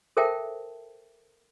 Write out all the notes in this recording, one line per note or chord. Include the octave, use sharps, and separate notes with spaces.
A4 A#4 C5 E5 G5 A5